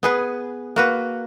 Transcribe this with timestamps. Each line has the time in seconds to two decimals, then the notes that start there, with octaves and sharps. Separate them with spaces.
0.03 B3 G#4 B4
0.76 A#3 F#4 B4